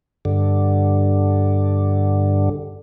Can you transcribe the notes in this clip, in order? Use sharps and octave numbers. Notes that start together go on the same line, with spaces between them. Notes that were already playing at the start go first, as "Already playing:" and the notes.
G2 D3